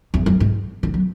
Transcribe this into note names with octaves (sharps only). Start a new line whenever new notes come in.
E2
F#2
G#2
D3
F#3